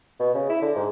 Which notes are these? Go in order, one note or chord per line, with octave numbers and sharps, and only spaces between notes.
B2
C#3
E4
D3
G#2